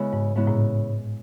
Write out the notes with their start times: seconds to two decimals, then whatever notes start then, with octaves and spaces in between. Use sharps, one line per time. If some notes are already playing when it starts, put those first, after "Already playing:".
Already playing: C#3 G#3 B3 C#4 E4
0.13 G#2
0.36 G#2 C#3 G#3 B3 E4
0.47 A2